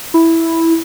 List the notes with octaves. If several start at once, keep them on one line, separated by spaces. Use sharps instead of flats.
E4